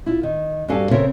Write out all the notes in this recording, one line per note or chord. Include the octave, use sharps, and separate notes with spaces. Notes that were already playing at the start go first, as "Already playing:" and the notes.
E4 F4
D#3
G2 G3 F#4 A4 F5 G#5
C#3 C4 A4 A#4 C#5 E5